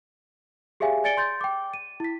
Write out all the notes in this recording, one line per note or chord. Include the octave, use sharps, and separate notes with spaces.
G4 G#4 C#5 E5 F5 G#5
D5 G#5 A6 C#7 D7 G7
C6 G6 A6
G5 D6
D#7
E4 B6